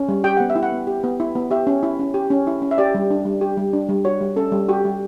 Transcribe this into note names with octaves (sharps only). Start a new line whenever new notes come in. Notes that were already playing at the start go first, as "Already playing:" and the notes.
Already playing: C#4
G3
G4 G5
B3 F#5
E5
E4
F#5
B3
G4
B3
E4
B3
G4 E5
C#4
E4
C#4
G4
C#4
E4
C#4
E5
G4 D5
G3
D4
G3
G4
G3
D4
G3
F#4 C#5
G3
C#4 A4
G3
F#4 G4
G3